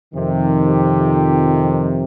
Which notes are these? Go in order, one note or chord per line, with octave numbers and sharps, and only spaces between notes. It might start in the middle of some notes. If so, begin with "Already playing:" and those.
F2 C3 D#3
G4